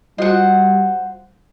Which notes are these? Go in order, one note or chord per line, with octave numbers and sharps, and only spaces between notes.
G3 F4 F#4 C5 D#5 F#5